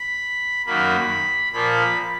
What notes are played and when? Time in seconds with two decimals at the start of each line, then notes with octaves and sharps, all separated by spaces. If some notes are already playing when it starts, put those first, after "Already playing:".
Already playing: B5
0.66 F#2 D#3 F#3 A#3 B5
1.52 A#2 F3 A#3 B5